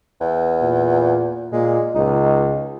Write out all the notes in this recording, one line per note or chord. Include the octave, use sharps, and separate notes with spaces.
E2
A#2
A#2 G#3
C#2 D#4